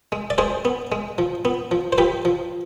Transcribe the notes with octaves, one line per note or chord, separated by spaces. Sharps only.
G#3
D5
G#3 G#4 C5
B3
G#3
F3
B3
F3
C5
F3 G4 B4
F3